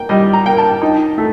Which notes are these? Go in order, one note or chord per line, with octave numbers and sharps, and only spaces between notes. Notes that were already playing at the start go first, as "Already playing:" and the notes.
Already playing: A#3 G5
G3 D#5
A#5
A#3 G5
A5
D#4
A3